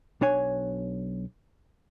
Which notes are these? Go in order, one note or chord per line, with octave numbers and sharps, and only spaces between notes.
B1 D4 C#5 G#5